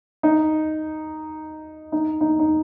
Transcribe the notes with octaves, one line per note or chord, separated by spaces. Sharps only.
D#4
D#4
D#4
D#4